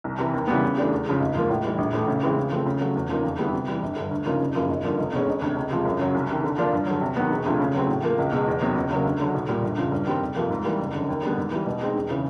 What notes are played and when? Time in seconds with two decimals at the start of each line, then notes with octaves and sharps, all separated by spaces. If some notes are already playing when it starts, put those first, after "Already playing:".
0.04 C2
0.18 C3 E3
0.34 D#2
0.47 C#3 E3 G3 B3
0.63 C#3
0.77 E3 A3 D4 G4
0.92 E2
1.06 C#3 F3 G#3
1.20 G#1
1.35 G#2 F3 A#3
1.50 A2
1.64 E3 G3
1.78 A#1
1.93 A2 E3 A3
2.08 C#3
2.23 E3 G#3 C4
2.37 C#3
2.51 F3 A3 C4
2.66 C#3
2.81 F#3 A3
2.96 E2
3.09 C#3 F3 A#3 D#4
3.24 F2
3.39 D3 G3 B3 E4
3.53 C3
3.68 E3 G3
3.82 G1
3.96 G2 D3
4.11 D2
4.26 C#3 F3 A#3 D#4
4.40 F#1
4.55 F#2 C#3 F3 A#3
4.69 G#1
4.84 G2 D3 F3 A#3
4.98 F1
5.13 E2 B2 G#3 C#4
5.28 E1
5.42 D2 C3
5.56 C#2
5.70 C3 F3 G#3
5.85 F#2
5.99 C#3 F#3
6.15 C2
6.29 C3 D#3
6.44 D3
6.58 F3 A#3 D4 F4
6.73 G2
6.87 D3 F#3
7.01 C3
7.16 D#3 F#3 B3
7.30 E1
7.46 D2 C3 F3 A3
7.60 C#3
7.74 F#3 A3 C4
7.89 A2
8.03 F3 A#3
8.18 C#2
8.32 B2 G#3
8.47 E2
8.61 C3 D#3 F#3 B3
8.75 C#2
8.90 C#3 F#3 A#3
9.05 D2
9.20 D3 F#3
9.34 B1
9.49 A#2 G3
9.63 G1
9.78 F2 C#3 F3
9.92 G2
10.06 D#3 G3 C4
10.21 F1
10.36 F2 C3 F3 A#3
10.50 G#2
10.65 E3 G3 A#3
10.79 F#1
10.93 F#2 D3
11.09 D#2
11.23 D3 G3 B3
11.37 G#2
11.51 E3 G3
11.66 B2
11.81 G#3 C4 D#4
11.95 E1
12.11 C#3 E3